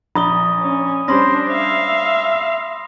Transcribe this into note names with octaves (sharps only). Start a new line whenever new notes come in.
A#1 A#5 B5 D#6 G7
C#4
G3 C#4 D4 C5 B5 C6 A#6
E5 F5